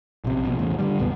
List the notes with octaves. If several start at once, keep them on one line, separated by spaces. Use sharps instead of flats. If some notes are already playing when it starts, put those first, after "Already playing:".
A#1 C3
A#1 B2
E2 A2 C#3
D3 D#3 G3
B1 E2 A#2 B3